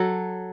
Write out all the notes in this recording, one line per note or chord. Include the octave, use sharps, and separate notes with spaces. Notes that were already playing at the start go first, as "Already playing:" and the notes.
Already playing: F#3 A4